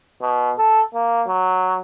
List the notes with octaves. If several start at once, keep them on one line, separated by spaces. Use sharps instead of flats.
B2
A4
A#3
F#3